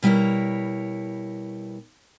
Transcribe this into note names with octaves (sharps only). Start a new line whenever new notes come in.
B2 G3 E4 A#4 C#5